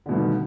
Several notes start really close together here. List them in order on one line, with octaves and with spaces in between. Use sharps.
D3 B2 G2 D#3